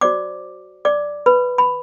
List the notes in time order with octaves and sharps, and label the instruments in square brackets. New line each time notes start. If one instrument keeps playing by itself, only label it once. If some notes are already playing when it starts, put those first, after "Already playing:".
[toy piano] F#4 C5 D5 D6
D5 D6
B4 B5
B5